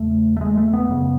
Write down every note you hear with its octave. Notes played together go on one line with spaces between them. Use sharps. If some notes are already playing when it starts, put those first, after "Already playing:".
Already playing: E2 C#3 A3
A3
G#3
A3
B3
F#2 C#3